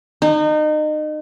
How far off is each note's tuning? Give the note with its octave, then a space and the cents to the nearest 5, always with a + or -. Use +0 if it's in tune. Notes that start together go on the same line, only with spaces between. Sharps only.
D#4 -30